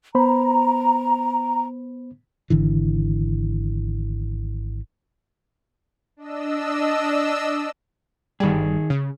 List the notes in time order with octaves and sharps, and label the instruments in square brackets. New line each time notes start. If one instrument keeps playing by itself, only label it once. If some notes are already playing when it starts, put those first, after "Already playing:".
[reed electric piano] B3 C5 B5 [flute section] A#5
[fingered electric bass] G#1 D3 E3
[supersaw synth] D4 D#5 E6
[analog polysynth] G1 G3 [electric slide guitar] D#3 G#4
[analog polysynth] C#3